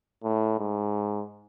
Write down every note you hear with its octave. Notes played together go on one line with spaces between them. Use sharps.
A2
G#2